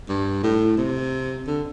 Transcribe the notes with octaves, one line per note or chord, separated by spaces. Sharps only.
G2
A2
C3
D3